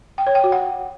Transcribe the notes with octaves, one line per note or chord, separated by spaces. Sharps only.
G5
C#5
G5
F#4
F#5